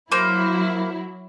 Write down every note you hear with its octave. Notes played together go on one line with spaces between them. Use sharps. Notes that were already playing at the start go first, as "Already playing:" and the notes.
F#3 A#3 E4 C5